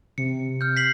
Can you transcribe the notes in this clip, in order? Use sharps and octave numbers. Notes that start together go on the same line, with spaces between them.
C3 C#7
F6 G6
B6 C7 F#7